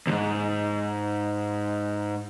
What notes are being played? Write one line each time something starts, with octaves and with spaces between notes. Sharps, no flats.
D2 G#2